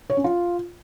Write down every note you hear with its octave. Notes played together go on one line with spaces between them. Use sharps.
C#5
C#4
F4